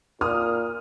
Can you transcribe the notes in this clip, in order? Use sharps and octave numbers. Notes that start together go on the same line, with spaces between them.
A#2 D#6 F6